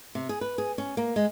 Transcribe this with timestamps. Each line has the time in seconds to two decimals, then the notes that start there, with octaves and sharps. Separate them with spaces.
0.15 C3
0.29 G#4
0.41 B4
0.58 G#4
0.78 C#4
0.97 A#3
1.16 G#3